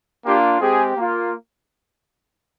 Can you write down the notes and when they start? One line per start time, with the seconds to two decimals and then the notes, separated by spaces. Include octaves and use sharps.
0.24 A#3 D4 F4 G4
0.60 G#3 C4 G4 G#4
0.97 A#3 F4